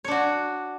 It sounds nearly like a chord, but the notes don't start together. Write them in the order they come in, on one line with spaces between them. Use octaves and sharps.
C#5 D4 F#4